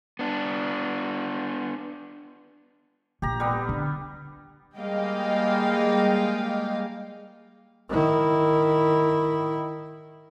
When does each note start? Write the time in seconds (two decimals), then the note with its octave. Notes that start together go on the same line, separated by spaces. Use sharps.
0.19 B3 D4
3.22 A#1 A#2 G4 A#5
3.40 G3 B3
3.69 D3
4.77 G3 G#3 A#3 D#5 F5 G5
7.89 D#3 E4